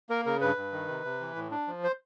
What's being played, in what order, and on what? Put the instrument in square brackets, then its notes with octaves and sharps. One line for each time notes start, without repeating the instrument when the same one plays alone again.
[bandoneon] A#3 A#4
C#3 A#4
G2 B4
G2
D#3
C3
C3
E3
A2
D4
F3
C5